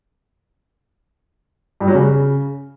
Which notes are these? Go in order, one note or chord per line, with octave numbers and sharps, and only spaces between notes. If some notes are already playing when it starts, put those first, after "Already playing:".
G2
F#3
C#3